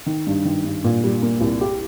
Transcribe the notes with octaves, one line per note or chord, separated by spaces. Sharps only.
D#3
G2
D#3
G2
A#2
G3
A#3
C2
G4